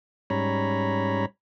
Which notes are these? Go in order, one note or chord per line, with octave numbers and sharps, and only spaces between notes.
G#2 G3 C#4 C#5 A#5 B5